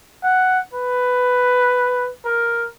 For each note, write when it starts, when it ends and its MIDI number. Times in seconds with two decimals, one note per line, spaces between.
0.23 0.59 78
0.73 2.10 71
2.25 2.66 70